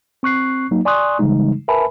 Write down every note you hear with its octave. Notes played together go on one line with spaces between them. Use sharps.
C4 C#6 F#6 C7
F#3 A#3 D#4
D5 G#5 C6 C#6 D#6 F#6
C#3 E3 G3 G#3 D#4
A#4 B4 E5 G#5 A5 B5